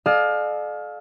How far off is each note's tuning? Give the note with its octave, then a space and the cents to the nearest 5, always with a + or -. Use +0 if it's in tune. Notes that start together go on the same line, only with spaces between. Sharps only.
A4 -40 D5 +40 F5 +20